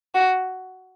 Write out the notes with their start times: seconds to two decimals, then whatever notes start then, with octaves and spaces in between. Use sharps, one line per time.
0.15 F#4